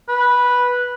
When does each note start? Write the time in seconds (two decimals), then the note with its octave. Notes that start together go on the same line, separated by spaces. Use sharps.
0.08 B4